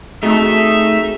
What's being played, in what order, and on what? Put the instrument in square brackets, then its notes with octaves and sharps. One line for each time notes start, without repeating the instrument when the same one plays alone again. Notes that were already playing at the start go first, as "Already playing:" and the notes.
[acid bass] A3 [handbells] C4 F#4 G#4 [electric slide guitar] D#4 [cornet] E5